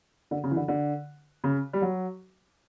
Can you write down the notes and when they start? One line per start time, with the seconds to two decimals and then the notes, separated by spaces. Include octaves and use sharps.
0.31 D3
0.44 C#3
0.51 E3
0.56 D3
0.68 D3
1.44 C#3
1.73 G3
1.82 F#3